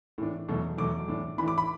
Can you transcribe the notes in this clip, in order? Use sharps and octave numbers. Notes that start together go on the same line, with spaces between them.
A2 E3 D4
E2 B2 F#3 A3
E2 B2 F#3 A3 D6
A2 E3 D4
A2 E3 D4 B5
D6
B5